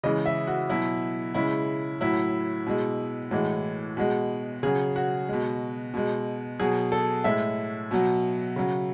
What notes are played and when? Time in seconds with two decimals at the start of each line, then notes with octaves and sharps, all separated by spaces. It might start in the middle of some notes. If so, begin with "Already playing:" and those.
0.03 C#3 E3 G#3 D#5
0.26 E5
0.47 F#4
0.69 B2 F#3 E4
1.34 C#3 G#3 E4
2.01 A2 F#3 E4
2.67 B2 G#3
3.31 A2 E3 G#3 F#4
3.97 B2 G#3 F#4
4.63 C#3 F#3 G#4
4.96 F#4
5.29 B2 G#3
5.94 B2 G#3
6.59 B2 F#3 G#4
6.92 A4
7.24 A2 G#3 E5
7.91 B2 F#3
8.56 C#3 F#3